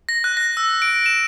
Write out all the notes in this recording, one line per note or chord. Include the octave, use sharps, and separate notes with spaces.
A#6
F#6
A#6
E6
D7
E7